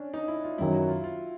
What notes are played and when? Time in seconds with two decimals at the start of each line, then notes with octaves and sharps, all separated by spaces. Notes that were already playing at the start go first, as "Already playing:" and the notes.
Already playing: C#4 D4
0.14 D#4
0.28 E4
0.44 F4
0.58 F#2 D#3 F#3 E4
0.74 F#4
0.89 F4
1.04 F4